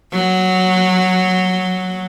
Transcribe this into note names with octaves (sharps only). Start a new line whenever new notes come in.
F#3